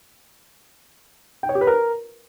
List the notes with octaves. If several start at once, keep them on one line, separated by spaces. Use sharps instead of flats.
G5
C#5
G4
B4
A#4